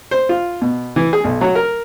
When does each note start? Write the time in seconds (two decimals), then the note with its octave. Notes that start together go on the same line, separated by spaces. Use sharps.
0.11 C5
0.29 F4
0.62 B2
0.96 E3
1.13 G#4
1.24 B1
1.41 F#3
1.55 A#4